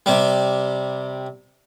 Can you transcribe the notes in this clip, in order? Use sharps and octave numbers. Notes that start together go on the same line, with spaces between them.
C3 G3